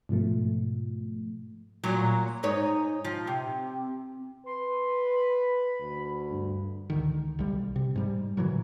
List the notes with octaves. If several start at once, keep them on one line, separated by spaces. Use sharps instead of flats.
G#2 B2 F3 A3
A#2 F#3
G#2 D#4 C#5
F3
C3
B4 C6
B5
D2
G2
C#2 D3 D#3
B1 G3
C3
G#2 G3
A#2 D3 E3 F#3